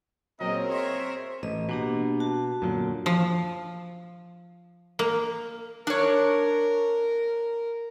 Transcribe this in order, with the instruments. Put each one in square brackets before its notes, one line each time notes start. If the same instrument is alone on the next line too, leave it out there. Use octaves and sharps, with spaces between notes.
[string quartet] A#2 C#3 [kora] F#3 [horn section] C4 A#4 [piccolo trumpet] D#5
[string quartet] G#4 C#5 E5 [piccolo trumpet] C6
[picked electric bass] A1 [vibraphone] D#5
[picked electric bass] B2 [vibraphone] A#3 D4 G4
[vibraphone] F#4 A5
[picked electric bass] F#2 A#2 D3
[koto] F3
A#3
[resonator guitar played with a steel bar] D4 C#5 [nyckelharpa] A#4